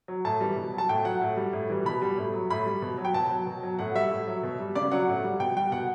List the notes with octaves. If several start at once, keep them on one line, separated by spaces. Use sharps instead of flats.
F#3
A2 A5
E3 G3
B2
F#3
A5
A2 G5
F#3 F#5
A2
G3
A2
E3 G3
B2 B5
G3
A2
F#3
A2 B5
G3
B2
F#3
G5
B2 A5
F#3
B2
F#3
A2 F#5
G3 E5
A2
F#3
B2
G3
C#3 D5
F#3 F#5
A2
G3
B2 G5
G3 G5
B2 F#5